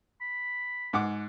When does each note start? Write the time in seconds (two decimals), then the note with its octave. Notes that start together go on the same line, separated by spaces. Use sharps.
0.21 B5
0.93 G#2 F#5 D6